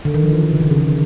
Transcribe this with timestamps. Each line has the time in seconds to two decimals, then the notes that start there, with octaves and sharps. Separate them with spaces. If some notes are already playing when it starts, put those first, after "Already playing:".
0.05 D3
0.14 D#3
0.23 F3
0.33 E3
0.42 D#3
0.52 C#3
0.61 D#3
0.71 C#3
0.80 D3